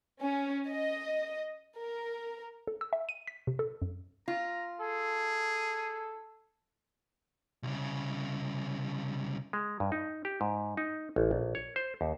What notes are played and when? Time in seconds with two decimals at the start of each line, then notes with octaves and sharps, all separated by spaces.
0.21 C#4
0.70 D#5
1.77 A#4
2.67 A4
2.81 E6
2.93 E5
3.09 D#7
3.27 B6
3.47 C3
3.59 A4
3.82 F#2
4.28 F4 A#5
4.80 G#4 A4
7.63 C2 C#3
9.53 G#3
9.80 G2
9.92 D#4
10.25 G4
10.41 G#2
10.77 D#4
11.16 A1
11.31 A#1
11.55 C#5
11.76 C5
12.01 D#2